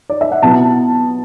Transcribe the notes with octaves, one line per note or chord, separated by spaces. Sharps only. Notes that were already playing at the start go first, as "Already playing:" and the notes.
D5
E5
F#5
B2 F#3 B3 E4 A5